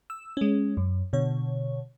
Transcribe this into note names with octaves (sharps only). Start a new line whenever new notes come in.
E6
G#3 C#4
F#2
B2 D3 C#5